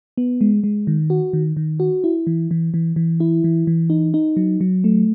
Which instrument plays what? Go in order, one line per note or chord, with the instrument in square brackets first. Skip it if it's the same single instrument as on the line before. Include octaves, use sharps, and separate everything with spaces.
[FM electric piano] B3
G#3
G#3
D#3
F#4
D#3
D#3
F#4
E4
E3
E3
E3
E3
E4
E3
E3
D#4
D#4
F#3
F#3
A3